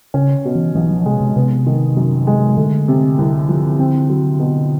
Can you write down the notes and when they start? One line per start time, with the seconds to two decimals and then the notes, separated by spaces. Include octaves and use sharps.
0.14 C#3 C#4
0.45 B2
0.55 E3
0.75 B1 E3
0.91 F3
1.06 C3 G#3
1.21 C3
1.36 C3 B3
1.67 D#3
1.97 F#2
2.27 G#3
2.57 D3 A3
2.88 C3
3.19 C2
3.49 F3
3.79 C4
4.09 F#3
4.39 B2